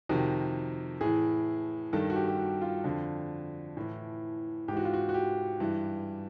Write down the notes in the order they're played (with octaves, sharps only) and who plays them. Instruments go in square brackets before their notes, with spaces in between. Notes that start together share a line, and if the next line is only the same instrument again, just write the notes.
[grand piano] F2 C3 D#3 F#4
A2 E3 G#4
G2 D#3 A4
F#4
G4
G4
F#4
F4
F2 D3
A2 E3
G#2 G4
E3 F#4
F4
F#4
F#4
G4
G2 E3